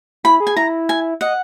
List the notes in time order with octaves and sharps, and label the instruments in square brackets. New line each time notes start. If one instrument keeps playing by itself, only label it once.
[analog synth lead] E4 [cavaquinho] B5
[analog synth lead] G#4
[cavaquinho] G#5
[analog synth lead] E4 [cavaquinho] A#5
[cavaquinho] G#5
[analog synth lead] D#5 [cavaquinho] F#5